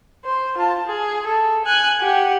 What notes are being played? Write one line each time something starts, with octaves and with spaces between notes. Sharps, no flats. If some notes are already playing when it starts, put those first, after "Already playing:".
C5
F4 A5
G#4
A4
G#5 F#6
G4 F#5